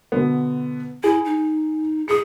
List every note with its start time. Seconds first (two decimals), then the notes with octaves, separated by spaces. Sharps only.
0.12 B2 D3 B3
1.04 E4 G#4
1.25 D#4
2.08 G#4 D#6 C#7